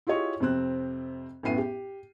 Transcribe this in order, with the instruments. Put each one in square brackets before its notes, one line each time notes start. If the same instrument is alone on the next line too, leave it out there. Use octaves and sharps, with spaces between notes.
[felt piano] E4 F4 G4 G#4 C#5 D#5
F2 C3 C4 F#6
A1 F#2 A2 B3 C7 D#7
G4